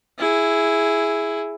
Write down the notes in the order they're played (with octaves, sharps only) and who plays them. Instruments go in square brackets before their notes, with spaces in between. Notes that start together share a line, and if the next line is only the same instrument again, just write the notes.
[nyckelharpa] E4 G#4